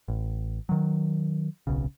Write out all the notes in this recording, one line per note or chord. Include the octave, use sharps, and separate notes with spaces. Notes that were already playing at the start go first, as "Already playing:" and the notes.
A1
D#3 F#3
D1 B1 C#3